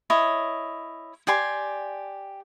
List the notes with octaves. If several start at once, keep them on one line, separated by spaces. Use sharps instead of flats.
E4 C#5 D#5
G4 D5 G#5 C6